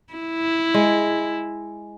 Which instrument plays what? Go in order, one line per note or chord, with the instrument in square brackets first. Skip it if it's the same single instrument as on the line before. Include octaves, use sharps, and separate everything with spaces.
[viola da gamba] E4
[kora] G#3